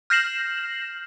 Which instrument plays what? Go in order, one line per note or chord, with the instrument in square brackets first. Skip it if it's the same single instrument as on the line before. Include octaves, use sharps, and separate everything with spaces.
[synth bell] F6 G6 A#6 C7 E7 F#7